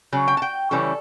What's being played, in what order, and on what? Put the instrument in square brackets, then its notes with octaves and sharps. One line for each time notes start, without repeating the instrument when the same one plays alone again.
[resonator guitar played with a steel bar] C#3 F#3
G5
A5
G5
C#3 E3 G3 C#4 A4